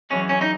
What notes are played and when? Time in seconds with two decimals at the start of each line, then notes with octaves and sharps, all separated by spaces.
0.10 F#2 E3 G#3 C#4
0.29 C#4
0.41 D#4